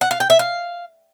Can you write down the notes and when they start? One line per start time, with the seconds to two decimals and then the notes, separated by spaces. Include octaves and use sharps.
0.01 F#5
0.11 F5
0.20 G5
0.30 E5
0.39 F5